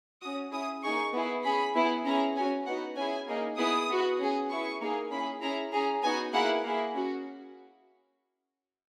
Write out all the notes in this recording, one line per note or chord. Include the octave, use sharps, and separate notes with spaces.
C#4 F#4 D#6
C#4 E4 G#4 D#6
A#3 D#4 G#4 C#6
B3 E4 G#4
C#4 G#4 B5
B3 E4 G#4
C#4 E4 G#4 A#5
C#4 F#4 G#5
B3 D#4 F#4 F#5
C#4 E4 G#4 G#5
A#3 D#4 G#4
B3 E4 G#4 D#6
B3 F#4
C#4 G#4
B3 E4 G#4 C#6
A#3 D#4 G#4
C#4 E4 G#4 B5
C#4 E4 G#4 A#5
C#4 G#4 A#5
B3 D#4 F#4 G#5
A#3 E4 G#4 F#5
A#3 E4 G#4
C#4 F#4